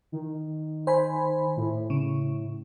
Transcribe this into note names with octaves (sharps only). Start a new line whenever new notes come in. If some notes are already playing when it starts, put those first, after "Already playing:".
D#3
C5 G#5 B5
A2
C#3